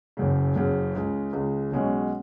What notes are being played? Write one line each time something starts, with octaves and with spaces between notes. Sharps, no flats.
F#1 F#2 C#3
F#1 F#2 C#3
C#2 C#3 G#3
C#2 C#3 G#3
B1 B2 G#3 C#4